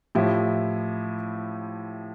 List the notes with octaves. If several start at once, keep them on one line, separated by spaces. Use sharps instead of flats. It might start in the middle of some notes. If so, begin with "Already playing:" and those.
A2 F3 E4 G4